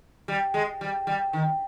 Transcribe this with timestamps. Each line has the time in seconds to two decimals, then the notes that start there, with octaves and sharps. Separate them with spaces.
0.28 G3
0.54 G#3
0.81 G3
1.07 G3
1.33 D#3